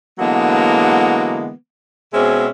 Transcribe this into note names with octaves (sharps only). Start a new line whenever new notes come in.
D3 E3 F#3 G#3 A#3 B3
B2 G#3 C4 C#4 G#4 E5